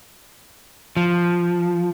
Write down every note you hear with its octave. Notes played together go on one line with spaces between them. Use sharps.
F3